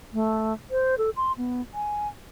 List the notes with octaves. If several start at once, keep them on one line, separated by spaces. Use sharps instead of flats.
A3
C5
A4
C6
B3
G#5